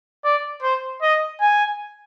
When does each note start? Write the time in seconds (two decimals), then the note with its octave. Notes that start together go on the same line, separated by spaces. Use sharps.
0.24 D5
0.63 C5
1.02 D#5
1.41 G#5